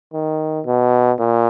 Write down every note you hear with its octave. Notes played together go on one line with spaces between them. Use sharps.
D#3
B2
A#2